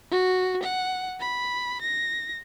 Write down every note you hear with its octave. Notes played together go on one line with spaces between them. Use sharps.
F#4
F#5
B5
A#6